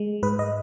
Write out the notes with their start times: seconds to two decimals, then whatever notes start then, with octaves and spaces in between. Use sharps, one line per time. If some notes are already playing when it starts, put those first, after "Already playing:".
Already playing: G#3
0.23 G#2 B4
0.39 D#5